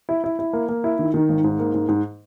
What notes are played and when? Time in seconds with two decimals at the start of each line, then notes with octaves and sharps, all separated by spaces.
0.09 E4
0.24 E4
0.39 E4
0.53 A#3
0.69 A#3
0.84 E4
0.99 D#3
1.14 D#3
1.29 G#1
1.44 G#2
1.59 A#3
1.74 G#2
1.89 G#2